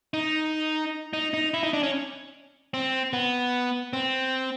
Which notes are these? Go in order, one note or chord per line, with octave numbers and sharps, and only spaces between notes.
D#4
D#4
D#4
E4
D#4
D4
C#4
C4
B3
C4